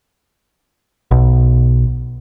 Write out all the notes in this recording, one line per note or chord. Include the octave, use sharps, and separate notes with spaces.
B1